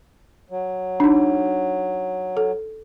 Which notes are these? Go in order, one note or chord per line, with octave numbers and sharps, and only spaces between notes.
F#3
D4 D#4
A4